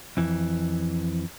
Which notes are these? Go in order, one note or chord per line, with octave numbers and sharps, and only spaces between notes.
F2 E3